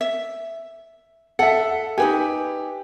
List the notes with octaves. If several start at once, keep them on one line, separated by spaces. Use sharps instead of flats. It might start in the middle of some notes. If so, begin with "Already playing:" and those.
E5
A4 E5 F#5
D#4 G4 B4 G#5